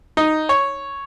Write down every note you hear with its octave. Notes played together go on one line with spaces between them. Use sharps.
D#4
C#5